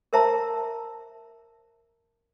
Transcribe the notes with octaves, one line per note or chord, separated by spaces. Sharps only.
A#4 C5 E5 A5 A#5